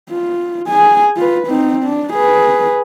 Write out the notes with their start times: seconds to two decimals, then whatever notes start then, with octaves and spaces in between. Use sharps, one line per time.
0.11 F4
0.68 G#4 G#5
1.17 F4 B4
1.47 C4 D#4
1.84 D4
2.14 G#4 B4